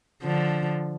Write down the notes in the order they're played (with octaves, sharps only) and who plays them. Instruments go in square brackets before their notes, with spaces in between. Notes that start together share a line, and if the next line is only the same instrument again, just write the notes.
[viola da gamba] D3 F3